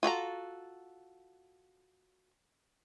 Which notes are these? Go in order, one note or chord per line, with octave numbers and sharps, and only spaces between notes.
F4 F#4 A4 A#5